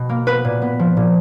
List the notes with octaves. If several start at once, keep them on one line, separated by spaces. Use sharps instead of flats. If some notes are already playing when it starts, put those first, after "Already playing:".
Already playing: B2
A#3
B3 B4
A#2
B3
F3
A#2